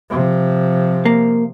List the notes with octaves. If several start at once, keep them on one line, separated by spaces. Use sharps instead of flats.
C3 F3
A#3